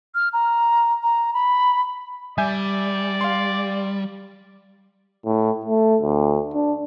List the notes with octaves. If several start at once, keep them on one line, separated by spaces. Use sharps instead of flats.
F6
A#5
A#5
B5
G3 D5 E5 G#5 G6
F5 C6
A2
A3
D2
D4